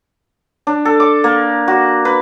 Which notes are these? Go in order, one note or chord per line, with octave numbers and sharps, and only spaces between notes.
D4
A4
D6
A#3
F#4
B4